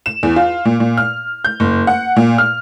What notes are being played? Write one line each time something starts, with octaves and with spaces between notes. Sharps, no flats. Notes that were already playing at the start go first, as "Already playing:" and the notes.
E7
E2
F4
A#2
A#2
F6
G6
F#1
F#5
A#2
F6